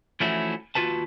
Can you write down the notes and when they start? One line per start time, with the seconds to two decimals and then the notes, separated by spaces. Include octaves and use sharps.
0.20 E3 F3 A3 C#4 E4 F#4
0.75 D#2 F4 F#4 B4 A5